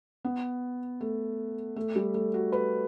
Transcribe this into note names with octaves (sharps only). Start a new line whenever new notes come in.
B3
A3
A3
G3
A3
F#4
B4